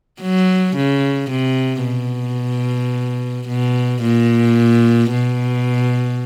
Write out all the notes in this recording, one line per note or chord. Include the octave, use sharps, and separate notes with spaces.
F#3
C#3
C3
B2
B2
A#2
B2